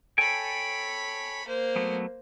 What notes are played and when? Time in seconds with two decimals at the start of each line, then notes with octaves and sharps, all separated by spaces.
0.18 A4 C#5 G5 G#5 B5
1.47 A#3 C5
1.76 F#3 A3 B3